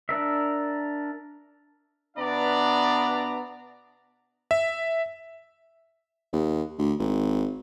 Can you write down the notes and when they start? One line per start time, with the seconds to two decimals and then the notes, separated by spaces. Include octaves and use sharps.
0.09 D4 A#4 E5
2.17 B2 B3 D4 D5 E5 A#5
4.51 E5
6.33 D#2
6.79 D2
6.99 G#1